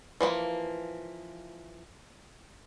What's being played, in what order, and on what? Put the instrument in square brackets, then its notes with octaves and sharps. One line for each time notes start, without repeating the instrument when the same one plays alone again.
[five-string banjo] E3 F3 G3 A#3